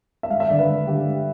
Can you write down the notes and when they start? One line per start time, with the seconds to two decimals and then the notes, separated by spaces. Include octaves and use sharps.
0.23 E5
0.30 G2 F5
0.40 E5
0.49 D3 D5
0.59 B4
0.69 G2
0.87 D3 G4
1.06 G2